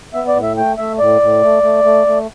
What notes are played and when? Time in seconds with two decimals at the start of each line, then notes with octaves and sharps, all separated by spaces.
0.14 B3 E5
0.28 D5
0.35 A2
0.43 E5
0.57 A3 G5
0.78 A3 E5
0.99 A2 D5
1.22 A2
1.42 A3
1.63 A3
1.84 A3
2.07 A3